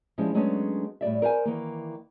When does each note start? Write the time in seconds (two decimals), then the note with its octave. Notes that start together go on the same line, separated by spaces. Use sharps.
0.18 F3 G3 G#3 C#4 E4
0.34 F#3 G#3 A3 B3 C#4 D4
1.01 A2 G3 D5 E5
1.22 A#4 C5 F5 G#5
1.45 D#3 E3 A#3